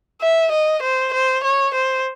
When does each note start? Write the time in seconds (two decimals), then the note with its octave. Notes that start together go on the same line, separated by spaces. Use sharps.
0.21 E5
0.52 D#5
0.82 C5
1.14 C5
1.44 C#5
1.74 C5